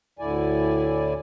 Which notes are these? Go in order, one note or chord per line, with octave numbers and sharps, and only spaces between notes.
D2 A2 D3 E4 D5 G#5